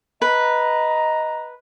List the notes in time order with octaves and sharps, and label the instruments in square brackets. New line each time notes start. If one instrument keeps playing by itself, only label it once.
[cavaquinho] B4 [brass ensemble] D#5 A#5